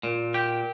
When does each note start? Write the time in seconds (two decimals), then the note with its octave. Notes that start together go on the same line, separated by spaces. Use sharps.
0.03 A#2
0.34 G4